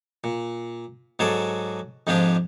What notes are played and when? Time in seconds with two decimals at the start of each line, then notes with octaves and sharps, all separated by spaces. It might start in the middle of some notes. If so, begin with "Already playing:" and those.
0.24 A#2
1.19 G#2 F#3 G#4 A4 D5
2.07 F2 G#2 F3 D4 G4 G#4